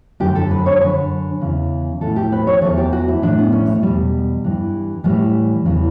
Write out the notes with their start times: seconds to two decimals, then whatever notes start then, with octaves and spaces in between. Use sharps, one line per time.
0.20 F#2 D3 G4
0.35 A4
0.51 B4
0.66 C#5
0.81 F#2 D3 B4
1.41 E2 C#3 E3
2.01 A2 E3 A4
2.16 G4
2.32 B4
2.47 C#5
2.62 E2 C#3 E3 A4
2.77 G4
2.93 F#4
3.08 E4
3.22 A2 E3 D4
3.38 B3
3.52 C#4
3.68 A3
3.83 E2 B2 G3
4.44 G2 E3
5.04 A2 E3 G3
5.65 E2 C#3 E3